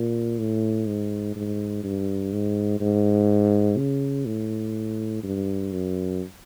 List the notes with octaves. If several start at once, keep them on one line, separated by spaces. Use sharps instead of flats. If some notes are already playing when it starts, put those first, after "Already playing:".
Already playing: A#2
A2
G#2
G#2
G2
G#2
G#2
C#3
A2
G2
F#2